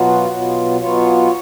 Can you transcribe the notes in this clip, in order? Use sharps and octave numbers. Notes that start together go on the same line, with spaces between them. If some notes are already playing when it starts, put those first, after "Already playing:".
Already playing: B2 F#3 B3 F4 F#4
B2 F#3 B3 F4
B2 F#3 B3 F4 C#5